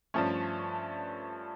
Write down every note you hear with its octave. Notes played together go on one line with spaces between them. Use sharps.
G2 F3 A3 C#4